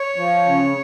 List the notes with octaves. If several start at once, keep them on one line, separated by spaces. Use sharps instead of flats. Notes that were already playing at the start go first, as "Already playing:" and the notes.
Already playing: C#5
F3
C#3